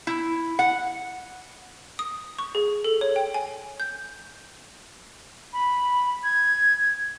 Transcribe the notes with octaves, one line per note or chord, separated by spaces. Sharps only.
E4
F#5
D#6
C#6
G#4
A4
C#5
G5
G#5
G6
B5
G#6